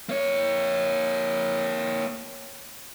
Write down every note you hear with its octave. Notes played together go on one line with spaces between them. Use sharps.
A#3 C#5